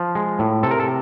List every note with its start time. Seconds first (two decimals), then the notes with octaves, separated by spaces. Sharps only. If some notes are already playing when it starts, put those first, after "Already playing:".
Already playing: F3
0.15 G#3
0.39 A2
0.63 C3 A4
0.71 A#4
0.80 A4